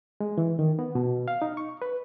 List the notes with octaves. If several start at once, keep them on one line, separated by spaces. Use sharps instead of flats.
G#3
E3
D#3
B3
B2
F5
D#4
C#6
B4